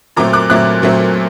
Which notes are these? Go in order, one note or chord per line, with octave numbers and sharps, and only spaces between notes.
A#2 F#3 A3 C4 A#5 D6
D6 F#6
A#2 F#3 A3 C4 D6 F#6
A#2 F#3 A3 C4